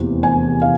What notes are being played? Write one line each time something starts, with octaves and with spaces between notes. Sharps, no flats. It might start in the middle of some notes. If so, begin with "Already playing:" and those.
Already playing: F1 E2 C3 E3 A#3
G#5
F5